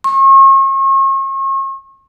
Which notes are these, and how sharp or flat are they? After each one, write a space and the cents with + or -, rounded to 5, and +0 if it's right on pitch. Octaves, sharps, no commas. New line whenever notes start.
C#6 -40